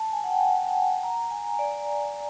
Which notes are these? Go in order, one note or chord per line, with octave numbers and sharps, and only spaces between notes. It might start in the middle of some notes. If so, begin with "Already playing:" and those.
Already playing: A5
G#5
F#5
G5
F#5
A#5
G#5
D5